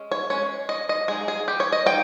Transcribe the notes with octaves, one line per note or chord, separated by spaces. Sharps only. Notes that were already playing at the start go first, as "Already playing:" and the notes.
Already playing: G#3 C#4
C#5
G#3 C#4 C#5
D#5
D#5
G#3 D#4 G#4
G#4
G4
C#5
D#5
D#4 G5